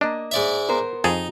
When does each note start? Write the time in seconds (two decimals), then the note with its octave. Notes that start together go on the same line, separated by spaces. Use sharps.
0.01 A#3 D4 D#5
0.31 G#2 D5 E5
0.69 B3 A#4 C5
1.04 F2 D#4 G#4 A5